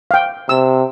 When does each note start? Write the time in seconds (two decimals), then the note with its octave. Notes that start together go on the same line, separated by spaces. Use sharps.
0.11 F5 G5
0.49 C3 E6